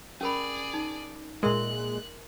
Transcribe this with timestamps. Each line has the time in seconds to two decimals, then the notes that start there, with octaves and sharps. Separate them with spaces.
0.21 C#4 G#4 A#4 D5 B5
0.74 D#4
1.43 A#2 G#3 A#4 E5 C6 F#6